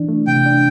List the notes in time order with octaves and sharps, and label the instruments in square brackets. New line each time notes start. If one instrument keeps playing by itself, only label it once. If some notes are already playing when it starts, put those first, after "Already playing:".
Already playing: [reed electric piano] E3 D4
A3
[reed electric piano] C3 [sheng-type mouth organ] G5
[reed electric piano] D4